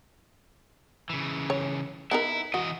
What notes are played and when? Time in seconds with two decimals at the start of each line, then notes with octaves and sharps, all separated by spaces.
1.10 C#3 E3
1.50 C#5
2.11 B3 D#4 E4 A#4
2.54 E3 F#4 D#5